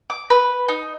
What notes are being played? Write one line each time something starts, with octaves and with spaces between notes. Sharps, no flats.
D6
B4
D#4